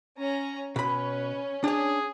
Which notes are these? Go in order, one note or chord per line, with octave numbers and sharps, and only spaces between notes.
C#4 A#5
B2 C#4 B4 B5
D4 G#4 C#5